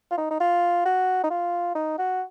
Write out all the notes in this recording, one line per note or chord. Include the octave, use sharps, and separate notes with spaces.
F4
D#4
D#4
F4
F#4
D#4
F4
D#4
F#4